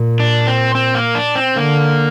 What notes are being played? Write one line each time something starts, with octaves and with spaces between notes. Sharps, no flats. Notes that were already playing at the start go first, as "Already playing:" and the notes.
Already playing: A#2
D4
C4
C4
A#3
D4
C4
D3 A#3